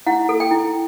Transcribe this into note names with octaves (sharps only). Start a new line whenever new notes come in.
E4 F#5
A4
G5
E4